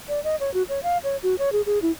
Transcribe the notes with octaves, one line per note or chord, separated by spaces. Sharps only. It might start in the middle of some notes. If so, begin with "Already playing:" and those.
D5
D#5
C#5
F#4
C#5
F5
C#5
F#4
C#5
G#4
G#4
E4